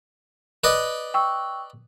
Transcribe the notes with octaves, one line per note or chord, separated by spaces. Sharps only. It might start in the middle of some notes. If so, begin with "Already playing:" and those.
B4 D5 D#5
G5 C#6 E6